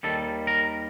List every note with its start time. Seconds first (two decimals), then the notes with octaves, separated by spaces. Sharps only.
0.03 D#2 D#3 G3 A4
0.47 A#4